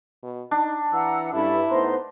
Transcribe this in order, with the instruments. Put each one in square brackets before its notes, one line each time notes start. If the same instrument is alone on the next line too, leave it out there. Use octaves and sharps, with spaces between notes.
[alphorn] B2
[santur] D4 [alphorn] D#4
[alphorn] E3 [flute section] F#5 A#5 E6
[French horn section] G2 [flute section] C#4 A4 B5 [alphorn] E4
[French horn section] A2 B3 C5 [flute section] D#4 A#5 C6